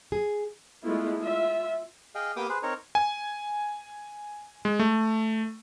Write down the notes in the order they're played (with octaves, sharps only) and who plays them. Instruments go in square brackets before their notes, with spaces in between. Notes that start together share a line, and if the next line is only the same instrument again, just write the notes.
[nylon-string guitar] G#4
[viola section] G#3 A3 B3 E4 F4
F4 E5
[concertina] G#4 D#5 F5 G5
A#3 B3 G4 G5 D6 D#6
G#4 B4 C5
C4 D#4 A#4 C#5
[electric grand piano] G#5
G#3
A3